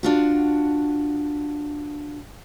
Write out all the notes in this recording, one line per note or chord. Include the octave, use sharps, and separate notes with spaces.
D4 F4 F#4